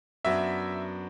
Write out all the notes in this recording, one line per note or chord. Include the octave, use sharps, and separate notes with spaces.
F#2 F#3 B3 D4 E5